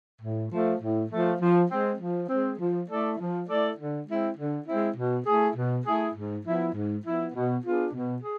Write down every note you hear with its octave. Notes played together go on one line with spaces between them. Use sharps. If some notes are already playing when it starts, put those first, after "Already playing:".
A2
F3 A3
A2
F3 A3
F3
G#3 C4
F3
G#3 C4
F3
A3 E4 A4 D5
F3
A3 E4 A4 D5
D3
G#3 C4 E4
D3
G#3 C4 E4
B2
A3 E4 G#4
B2
A3 E4 G#4
G#2
F3 B3 E4
G#2
F3 B3 E4
B2
B3 D4 F4 G#4
B2
G#4